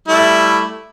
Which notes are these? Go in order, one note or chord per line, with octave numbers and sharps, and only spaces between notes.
G3 A3 E4